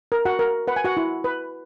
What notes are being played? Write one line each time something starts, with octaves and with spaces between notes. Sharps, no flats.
A#4
F#4 F#5
A#4
B4 F#5
G#5
F#4 F#5
E4
B4